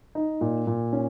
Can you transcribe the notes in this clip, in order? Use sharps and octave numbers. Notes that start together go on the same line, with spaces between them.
D#4
A#2
A#2
C#4